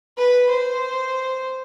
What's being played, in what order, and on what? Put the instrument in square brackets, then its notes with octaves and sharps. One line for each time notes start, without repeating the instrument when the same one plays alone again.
[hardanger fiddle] B4
C5